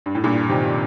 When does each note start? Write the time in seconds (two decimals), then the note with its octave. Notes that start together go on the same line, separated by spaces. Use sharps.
0.06 G2
0.15 A2
0.24 G2 A#2
0.49 C3 D#3